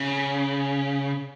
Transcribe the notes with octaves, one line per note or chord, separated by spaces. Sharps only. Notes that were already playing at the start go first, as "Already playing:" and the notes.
Already playing: C#3